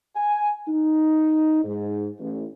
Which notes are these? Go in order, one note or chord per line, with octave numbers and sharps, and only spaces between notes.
G#5
D#4
G#2
A1